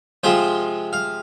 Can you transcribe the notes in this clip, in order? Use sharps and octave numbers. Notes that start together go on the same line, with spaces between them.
C3 F3 G#3 C5
F5